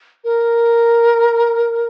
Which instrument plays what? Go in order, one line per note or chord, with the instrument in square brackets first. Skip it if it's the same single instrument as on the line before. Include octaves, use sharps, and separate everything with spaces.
[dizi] A#4